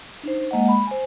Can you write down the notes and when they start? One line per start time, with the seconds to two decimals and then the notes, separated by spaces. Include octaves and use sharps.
0.23 D4 D#4 C5
0.51 G#3 A#3 D#5 F#5
0.68 B5
0.87 C5 G#5